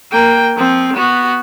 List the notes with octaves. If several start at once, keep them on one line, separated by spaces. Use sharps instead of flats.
A#3 G5
F3 C4
B3 F#4